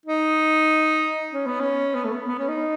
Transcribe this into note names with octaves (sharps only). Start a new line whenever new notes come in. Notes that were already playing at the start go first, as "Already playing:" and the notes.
D#4
C#4
B3
C#4
B3
A3
B3
B3
C#4
D#4